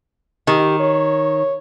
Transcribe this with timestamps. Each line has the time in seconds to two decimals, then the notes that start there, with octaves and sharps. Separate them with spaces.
0.47 D#3 G4
0.80 C#5